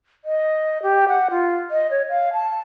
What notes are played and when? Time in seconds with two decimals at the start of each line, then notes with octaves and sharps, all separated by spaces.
0.25 D#5
0.82 G4
1.09 F#5
1.31 F4
1.71 D#5
1.91 C#5
2.10 F5
2.33 A5